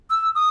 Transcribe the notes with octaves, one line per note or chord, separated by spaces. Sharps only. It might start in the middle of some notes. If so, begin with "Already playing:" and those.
E6
D#6